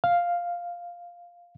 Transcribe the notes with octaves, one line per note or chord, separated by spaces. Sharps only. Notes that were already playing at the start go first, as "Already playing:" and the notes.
F5